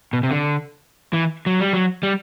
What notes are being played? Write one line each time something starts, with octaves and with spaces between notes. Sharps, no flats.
B2
C3
D3
E3
F#3
G3
F#3
G3